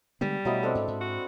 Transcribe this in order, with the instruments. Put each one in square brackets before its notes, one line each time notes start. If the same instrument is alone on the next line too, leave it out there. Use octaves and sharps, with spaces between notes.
[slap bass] D3 G#3 B3 [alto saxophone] G3
[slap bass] B2 A3 [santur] F#3 E4 D#5
[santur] C4 D4 A4
[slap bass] G#2
G#2
[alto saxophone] F#4